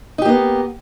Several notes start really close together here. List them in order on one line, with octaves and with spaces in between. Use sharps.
D#4 G4 A#3 B3